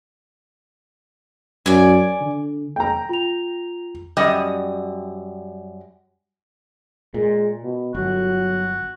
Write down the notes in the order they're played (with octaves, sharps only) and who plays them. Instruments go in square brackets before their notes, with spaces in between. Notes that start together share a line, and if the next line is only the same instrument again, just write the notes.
[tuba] F#2 [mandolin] D5 G#5
[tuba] D3
[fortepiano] G5 A#5
[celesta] F4 F7
[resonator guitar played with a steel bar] F#2 G3 D#5
[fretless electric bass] A#2 [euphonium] G#3
[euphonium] B2
[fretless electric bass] G1 [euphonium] F#3 [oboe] F#4